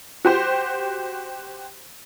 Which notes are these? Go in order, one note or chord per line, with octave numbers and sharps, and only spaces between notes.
F#4 G4 C5